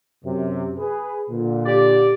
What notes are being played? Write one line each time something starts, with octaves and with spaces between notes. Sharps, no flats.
F#2 C3
G#4 B4
A#2 D3
G4 D5